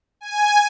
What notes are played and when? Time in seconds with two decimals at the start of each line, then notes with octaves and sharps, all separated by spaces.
0.21 G#5